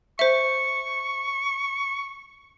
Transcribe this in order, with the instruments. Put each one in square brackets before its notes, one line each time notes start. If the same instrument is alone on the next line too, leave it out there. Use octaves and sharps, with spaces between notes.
[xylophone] C5 E5 [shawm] C#6